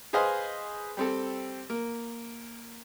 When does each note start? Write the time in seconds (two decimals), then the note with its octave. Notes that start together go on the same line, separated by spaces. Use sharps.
0.13 G#4 B4 C5 D#5 F5 G#5
0.97 G3 C4 A4
1.70 A#3